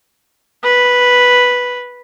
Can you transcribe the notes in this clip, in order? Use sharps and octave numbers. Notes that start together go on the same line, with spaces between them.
B4